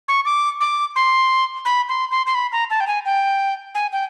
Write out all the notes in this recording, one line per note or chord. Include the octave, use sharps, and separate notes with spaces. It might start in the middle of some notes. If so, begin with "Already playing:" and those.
C#6
D6
D6
C6
B5
C6
C6
C6
B5
A#5
A5
G5
G#5
G5
G#5
G5